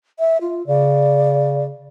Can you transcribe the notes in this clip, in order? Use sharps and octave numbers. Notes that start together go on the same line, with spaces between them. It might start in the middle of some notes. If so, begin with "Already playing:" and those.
E5
F4
C#3 D5